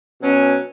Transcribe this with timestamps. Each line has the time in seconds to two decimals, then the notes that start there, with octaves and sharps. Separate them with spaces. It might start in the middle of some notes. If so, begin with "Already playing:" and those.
0.20 B2 F#3 C#4